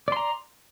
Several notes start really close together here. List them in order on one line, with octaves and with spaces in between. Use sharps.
D5 C6 A#5